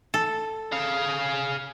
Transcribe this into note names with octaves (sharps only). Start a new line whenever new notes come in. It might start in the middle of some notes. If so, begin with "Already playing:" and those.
A4
G#4 F5